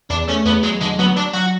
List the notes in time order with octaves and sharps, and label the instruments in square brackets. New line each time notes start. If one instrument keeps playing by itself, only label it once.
[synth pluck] E2 [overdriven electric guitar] D4
[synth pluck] A3 [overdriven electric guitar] C#4
[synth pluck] E2 [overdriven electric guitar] B3
[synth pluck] F#3 [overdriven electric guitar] G#3
[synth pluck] D3 [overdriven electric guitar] G#3
[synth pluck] F#3 [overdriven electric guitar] B3
[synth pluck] F#3 [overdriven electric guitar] D4
[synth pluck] F#3 [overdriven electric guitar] F#4